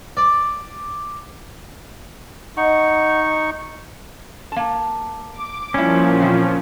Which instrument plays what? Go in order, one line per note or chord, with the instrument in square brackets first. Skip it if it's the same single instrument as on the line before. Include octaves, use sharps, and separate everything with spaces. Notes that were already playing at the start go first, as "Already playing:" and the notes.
[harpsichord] D5
[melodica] D#4 C#6 [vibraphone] D#5 F#5
[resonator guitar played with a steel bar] A#3 A5
[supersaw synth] D6
[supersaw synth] A#2 F3 [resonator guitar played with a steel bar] G3 E4 [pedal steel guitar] C#4
[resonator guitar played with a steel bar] E3 C4